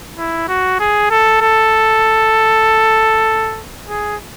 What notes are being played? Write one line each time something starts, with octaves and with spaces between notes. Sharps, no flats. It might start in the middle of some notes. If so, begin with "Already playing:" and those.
E4
F#4
G#4
A4
A4
G#4